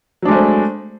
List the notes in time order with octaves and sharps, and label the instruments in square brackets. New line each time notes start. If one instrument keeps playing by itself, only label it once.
[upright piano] F#3
D4
G#3
A3
C4